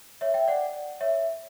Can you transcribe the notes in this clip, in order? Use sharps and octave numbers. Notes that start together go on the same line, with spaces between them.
C#5 E5
E5 G5
D5 F#5
C#5 E5